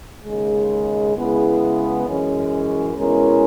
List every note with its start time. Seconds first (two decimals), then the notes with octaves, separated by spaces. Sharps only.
0.24 D#2 C#3 G#3
1.15 C#3 G#3 B3 E4 G#4
2.06 F#2 E3 G#3 C#4
2.96 B2 G#3 C#4 E4 A#4